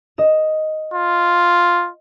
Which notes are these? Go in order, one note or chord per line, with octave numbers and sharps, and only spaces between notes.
D#5 E7
F4